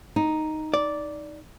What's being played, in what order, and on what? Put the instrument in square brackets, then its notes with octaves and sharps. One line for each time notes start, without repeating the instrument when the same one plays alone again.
[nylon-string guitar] D#4
[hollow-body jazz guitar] D5